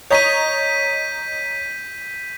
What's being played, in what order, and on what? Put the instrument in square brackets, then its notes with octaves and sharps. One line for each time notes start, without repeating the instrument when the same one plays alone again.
[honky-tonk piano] C#5 D#5 A#5 [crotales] G6 B6 D#7